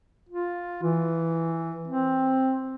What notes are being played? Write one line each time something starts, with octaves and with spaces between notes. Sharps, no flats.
F4
E3
C4